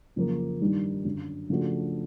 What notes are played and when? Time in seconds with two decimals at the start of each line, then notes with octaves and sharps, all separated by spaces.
0.16 F2 C#3 F#3 A#3
0.61 G2 D#3 G3
1.05 F#2 D3 F#3
1.50 C#3 F3 A3 D4 F#4